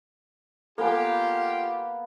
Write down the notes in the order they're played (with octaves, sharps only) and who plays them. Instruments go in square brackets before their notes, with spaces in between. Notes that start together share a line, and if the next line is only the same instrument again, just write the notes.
[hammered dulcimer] A#3 B3 [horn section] F4 G4 [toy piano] A4 G#5